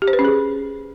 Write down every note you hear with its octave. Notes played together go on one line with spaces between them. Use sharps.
G4
C5
B4
C#4
G#4